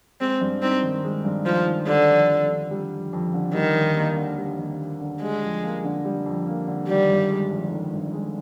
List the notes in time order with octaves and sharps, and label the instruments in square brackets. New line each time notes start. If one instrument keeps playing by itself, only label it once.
[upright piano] G#3 [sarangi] C4
[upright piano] G2
[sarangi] C4 [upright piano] D#4
[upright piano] D#3
G#3
G2
[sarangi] F3 [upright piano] D#4
[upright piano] D#3
[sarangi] D3 [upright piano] G3
[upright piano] F2
F2
D3
G3
F2
F2
D3
[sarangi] D#3 [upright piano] G3
[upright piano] D#2
A#3
D3
G3
D#2
A#3
D3
[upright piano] G3 [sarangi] G#3
[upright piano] F2
A#3
D3
G3
F2
A#3
D3
[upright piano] D#3 [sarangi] G3
[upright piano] G1
G#3
F2
D#3
G1
G#3